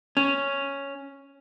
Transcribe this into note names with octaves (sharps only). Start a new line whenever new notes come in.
C#4